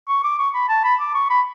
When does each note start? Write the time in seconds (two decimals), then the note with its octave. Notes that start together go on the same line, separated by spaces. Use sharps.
0.08 C#6
0.24 D6
0.39 C#6
0.54 B5
0.69 A5
0.84 B5
1.00 D6
1.14 C#6
1.30 B5